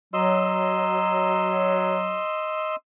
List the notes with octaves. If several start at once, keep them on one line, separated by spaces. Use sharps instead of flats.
F#3 D#5 C6 E6